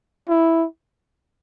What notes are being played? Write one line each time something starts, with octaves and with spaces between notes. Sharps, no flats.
E4